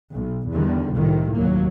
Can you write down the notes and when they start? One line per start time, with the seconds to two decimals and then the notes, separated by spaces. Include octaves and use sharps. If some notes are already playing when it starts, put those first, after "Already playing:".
0.14 B1
0.51 E2 D3 D#3 G3
0.93 C2 F2 A2 C3 D#3
1.35 F1 D#2 F#3 A#3